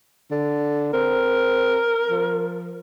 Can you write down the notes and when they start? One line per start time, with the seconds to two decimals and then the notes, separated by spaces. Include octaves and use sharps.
0.31 D3
0.93 C4 A#4
2.10 F3